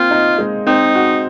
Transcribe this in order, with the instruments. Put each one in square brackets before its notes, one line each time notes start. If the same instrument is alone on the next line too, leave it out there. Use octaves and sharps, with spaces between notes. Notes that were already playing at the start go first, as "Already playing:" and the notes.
Already playing: [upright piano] A#3 C4 [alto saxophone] F4
[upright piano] D#4
G#3
[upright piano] C4 [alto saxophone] D#4
[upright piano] F#4